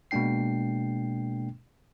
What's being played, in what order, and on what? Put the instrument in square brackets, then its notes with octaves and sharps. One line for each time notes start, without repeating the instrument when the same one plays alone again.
[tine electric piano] B2 G#3 A#3 D4 G5 C7